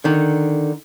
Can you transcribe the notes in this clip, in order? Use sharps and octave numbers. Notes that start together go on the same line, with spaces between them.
D3 D#3